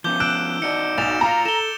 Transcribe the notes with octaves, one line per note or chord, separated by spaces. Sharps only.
F3 B3 C#4 D6 G6 G7
E6 F#6 D7 E7
D#4 F#4 D5 C#7
B1 A6 E7 F7
A#3 F4 F5 A#5
A4 E7 G7